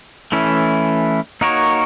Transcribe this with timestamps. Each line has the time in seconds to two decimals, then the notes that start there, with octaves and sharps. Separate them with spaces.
0.32 E3 A3 C#4 E4
1.41 A#3 D#4 F#4 A#4 C#5